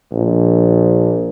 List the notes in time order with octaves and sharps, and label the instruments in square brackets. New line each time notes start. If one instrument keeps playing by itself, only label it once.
[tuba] A#1